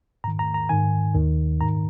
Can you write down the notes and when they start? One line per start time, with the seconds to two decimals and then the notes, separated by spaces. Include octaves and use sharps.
0.24 G#2 D#3 A#5
0.39 A#5
0.54 A#5
0.69 G#2 D#3 G#5
1.14 D#2 D#3
1.60 G#2 D#3 A#5